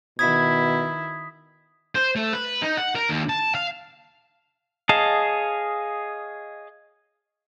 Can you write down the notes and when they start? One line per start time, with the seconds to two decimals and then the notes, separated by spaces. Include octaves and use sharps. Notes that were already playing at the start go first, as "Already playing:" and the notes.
0.19 B2 D#3 E4 D#6 G#6 B6
1.95 C5
2.16 A3
2.33 B4
2.62 D#4
2.77 F#5
2.95 A#4
3.09 D#2
3.29 A5
3.55 F5
4.89 G#4 C#5 D#5 F5 A5